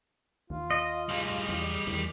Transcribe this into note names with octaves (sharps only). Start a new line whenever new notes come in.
D#2 F4
D#5
G3 G#4
E2
E2 D#3